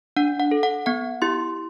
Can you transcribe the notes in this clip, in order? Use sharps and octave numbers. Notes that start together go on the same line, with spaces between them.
D4 F#5
F#5
A4
F#5
B3 F#5
E4 G4 C6